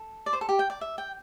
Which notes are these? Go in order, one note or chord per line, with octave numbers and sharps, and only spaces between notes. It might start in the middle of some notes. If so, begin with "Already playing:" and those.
Already playing: A4
D5
C5
A4
G4
G5
D5
E5
G5